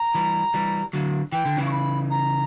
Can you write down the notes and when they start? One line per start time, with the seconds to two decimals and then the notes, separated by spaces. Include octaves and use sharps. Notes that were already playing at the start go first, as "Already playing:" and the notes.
Already playing: A#5
0.15 E3 G3
0.54 E3 G3
0.93 D3 F#3
1.32 E3 G5
1.46 D3
1.57 C#3 E3
1.66 C#6
1.71 B5
2.10 A#5